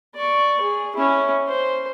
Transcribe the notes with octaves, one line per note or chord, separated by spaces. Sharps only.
D5 C#6
G#4
C#4 E4
C5